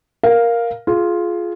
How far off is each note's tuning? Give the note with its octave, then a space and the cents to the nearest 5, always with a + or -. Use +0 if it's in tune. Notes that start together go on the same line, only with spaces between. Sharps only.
A#4 +5 F5 +0
F4 +0 G#4 +20